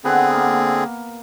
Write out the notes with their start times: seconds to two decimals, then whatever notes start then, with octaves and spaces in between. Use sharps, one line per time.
0.05 D3 B3 C4 G#4 B4 F#5
0.33 A#3